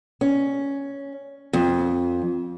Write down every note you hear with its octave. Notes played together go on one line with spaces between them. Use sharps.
C#4
F2